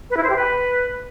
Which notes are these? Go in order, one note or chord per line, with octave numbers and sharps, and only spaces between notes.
B4
E4
C5
G4
B4